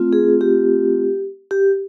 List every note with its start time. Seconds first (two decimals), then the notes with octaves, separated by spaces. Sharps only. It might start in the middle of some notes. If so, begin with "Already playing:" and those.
Already playing: A3 C4 F4
0.13 G#4
0.41 G4
1.51 G4